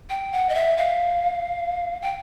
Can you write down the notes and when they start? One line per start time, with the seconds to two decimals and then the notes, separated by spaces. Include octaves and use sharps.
0.10 G5
0.32 F#5
0.49 D#5
0.54 E5
0.77 F5
2.02 G5